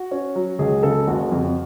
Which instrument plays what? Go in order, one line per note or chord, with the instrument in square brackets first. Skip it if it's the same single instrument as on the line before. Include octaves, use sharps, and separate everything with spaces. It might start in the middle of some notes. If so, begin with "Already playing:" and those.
Already playing: [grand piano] F#4
C#4
F#3
C#2 G#4
C#3 A4
F#1 F#4
F2